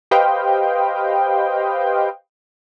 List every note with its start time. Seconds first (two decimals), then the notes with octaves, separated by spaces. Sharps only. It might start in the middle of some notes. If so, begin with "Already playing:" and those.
0.11 G4 B4 C5 D#5 F5 G5